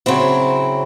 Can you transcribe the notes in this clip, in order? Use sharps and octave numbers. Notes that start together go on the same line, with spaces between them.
C#3 F#3 C4 E4